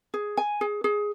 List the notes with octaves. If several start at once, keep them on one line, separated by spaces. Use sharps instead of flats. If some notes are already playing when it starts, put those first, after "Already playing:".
G#4
G#5
G#4
G#4